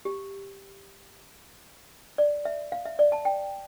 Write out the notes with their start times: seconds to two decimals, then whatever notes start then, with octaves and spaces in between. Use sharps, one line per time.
0.05 G4
2.18 D5
2.45 E5
2.72 F5
2.86 E5
2.99 D5
3.12 A5
3.25 G5